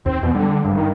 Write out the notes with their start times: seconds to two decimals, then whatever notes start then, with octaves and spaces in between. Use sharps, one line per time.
0.06 D#2 C4
0.23 E2 B2
0.35 D3 G3
0.65 G#1 G2
0.77 D#3